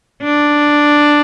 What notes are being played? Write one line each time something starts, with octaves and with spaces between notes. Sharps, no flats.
D4